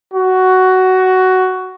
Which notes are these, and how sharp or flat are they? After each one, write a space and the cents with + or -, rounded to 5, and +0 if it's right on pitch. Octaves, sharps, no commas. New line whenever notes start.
F#4 +10